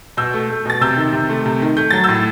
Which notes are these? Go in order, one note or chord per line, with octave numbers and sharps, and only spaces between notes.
B2 E6 G6
A3
A3
B2 A6
C3 E6 G6
D#3
C3
A3
C3
D#3
A3 G6
F#3 A6
A2 E6 G6